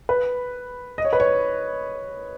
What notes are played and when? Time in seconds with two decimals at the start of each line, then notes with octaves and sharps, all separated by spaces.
0.09 B4
0.98 D#5
1.05 C#5
1.13 B4
1.20 C#5